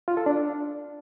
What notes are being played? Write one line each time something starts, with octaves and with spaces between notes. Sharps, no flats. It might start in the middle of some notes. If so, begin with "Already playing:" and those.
F4
A4
D4